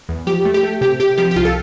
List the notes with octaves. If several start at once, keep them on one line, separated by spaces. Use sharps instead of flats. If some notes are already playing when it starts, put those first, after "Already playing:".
E2
F3 G4
A3
G4
A3
C3 G4
C3 G4
F3 G4
G4
C2 F4
A4